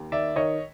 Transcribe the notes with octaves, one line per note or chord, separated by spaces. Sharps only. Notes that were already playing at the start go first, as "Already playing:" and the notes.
Already playing: D#2
D#3 D5 E5
D#3 C#5 D#5